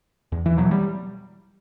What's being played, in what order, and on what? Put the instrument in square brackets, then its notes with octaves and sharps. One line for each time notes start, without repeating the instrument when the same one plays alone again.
[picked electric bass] E2
E3
B2 F#3
G3